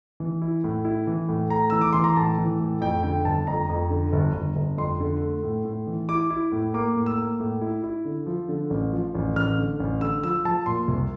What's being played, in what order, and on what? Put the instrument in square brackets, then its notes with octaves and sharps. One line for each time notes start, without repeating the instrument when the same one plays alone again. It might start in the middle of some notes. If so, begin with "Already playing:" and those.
[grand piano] E3
E4
A2
E4
E3
A2
A3 A#5
E3 E6
D6
E3 C6
A#5
A2 A5
E3
A2
F2 G5
D3 G5
G1 A5
F2 A#5
F2
D3
G1
G1
G1
F2 C6
D3
A3
A2
A2
E3
E4 D6
E4
A2
A#3 D6
A2
E6
A#3
A2
E4
E4
D3
F3
D3
A1
F3
A1
A1 F6
D3
A1
D3 E6
F3 E6
F3 A5
A#2 C6
C2